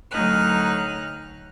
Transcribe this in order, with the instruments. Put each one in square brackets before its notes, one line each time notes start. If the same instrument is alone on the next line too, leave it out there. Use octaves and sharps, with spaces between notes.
[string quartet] D2 F#3 D#4 F6 F#6